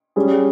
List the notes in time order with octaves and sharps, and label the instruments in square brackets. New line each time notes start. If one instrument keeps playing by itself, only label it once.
[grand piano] G3 C#4 G#4